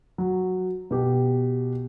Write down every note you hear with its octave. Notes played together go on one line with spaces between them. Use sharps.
F#3
B2 G4